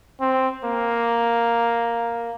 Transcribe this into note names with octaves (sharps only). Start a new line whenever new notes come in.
C4
A#3